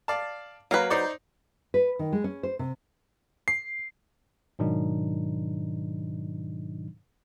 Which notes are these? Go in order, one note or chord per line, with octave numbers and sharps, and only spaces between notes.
D5 F5 A5
F#3 A#3 B4 F5
D#4 C5 D5
B4
D#3
G#3
C#4
C5
C3
C7
G#2 B2 D#3 F#3 D4 D#4